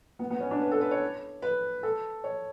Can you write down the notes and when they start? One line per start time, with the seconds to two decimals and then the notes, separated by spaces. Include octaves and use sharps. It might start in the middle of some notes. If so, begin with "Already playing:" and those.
0.19 B3
0.30 B3
0.40 C#4
0.51 D4
0.61 B4
0.71 A4
0.81 B4
0.91 C#5
1.42 B4
1.83 A4
2.24 C#5